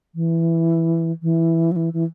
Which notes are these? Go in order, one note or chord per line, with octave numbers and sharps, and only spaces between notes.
E3
E3
F#3
E3
E3